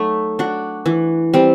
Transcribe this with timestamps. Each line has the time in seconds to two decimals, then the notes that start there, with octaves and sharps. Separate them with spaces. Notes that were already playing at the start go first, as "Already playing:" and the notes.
Already playing: F#3 A3 D#4
0.39 D4 F#4
0.86 E3
1.34 G3 C4